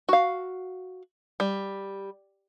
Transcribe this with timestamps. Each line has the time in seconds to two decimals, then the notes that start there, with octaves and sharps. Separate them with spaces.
0.09 F#4 F5
1.40 G3